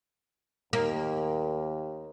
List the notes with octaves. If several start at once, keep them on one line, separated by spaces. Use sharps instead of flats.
D#2 A#3